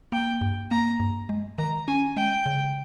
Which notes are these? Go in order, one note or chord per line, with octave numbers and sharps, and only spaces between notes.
A#3 G5
G2
A#3 A#5
G2
G#3
D#3 A#5
C#4 G#5
G#3 G5
C#3